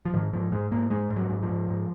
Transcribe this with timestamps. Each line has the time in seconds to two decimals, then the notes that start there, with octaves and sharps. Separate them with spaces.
0.05 F3
0.14 G#2 D#3
0.33 G#2 F3
0.52 G#2 G#3
0.71 G#2 A#3
0.90 G#2 G#3
1.10 G#2
1.16 F#3
1.29 G#2
1.42 F3
1.49 G#2
1.68 G#2